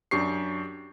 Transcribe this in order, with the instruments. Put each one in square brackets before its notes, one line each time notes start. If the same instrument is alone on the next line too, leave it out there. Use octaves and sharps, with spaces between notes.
[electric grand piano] F#2 D4 G4 C#6 C7